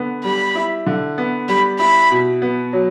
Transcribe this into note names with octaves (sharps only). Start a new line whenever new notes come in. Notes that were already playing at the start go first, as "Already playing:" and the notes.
Already playing: D3 B3
G3 B5
E4
D3
B3
G3 B5
E4 B5
B2
B3
F#3